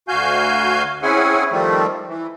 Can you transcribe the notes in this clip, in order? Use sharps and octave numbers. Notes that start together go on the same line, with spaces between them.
D2 F#4 F5 G#5 G6
C4 C#4 E4 G#4 F#5 G#5
D#3 F3 G3 A3 C4
E3